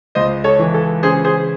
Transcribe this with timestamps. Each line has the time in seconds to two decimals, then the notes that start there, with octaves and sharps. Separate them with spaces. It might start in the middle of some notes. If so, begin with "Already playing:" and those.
0.15 C#2 C5 D#5
0.44 A4 C#5
0.59 E3
0.74 A4
1.03 C#3 G#4 C5
1.25 G#4 C5